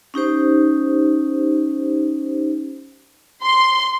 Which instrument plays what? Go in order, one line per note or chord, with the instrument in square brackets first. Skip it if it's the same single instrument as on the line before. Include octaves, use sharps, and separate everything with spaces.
[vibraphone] C#4 D#4 G4 C5
[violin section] C6